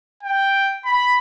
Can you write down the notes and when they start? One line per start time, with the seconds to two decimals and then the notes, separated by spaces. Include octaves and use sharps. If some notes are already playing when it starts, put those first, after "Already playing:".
0.23 G5
0.85 B5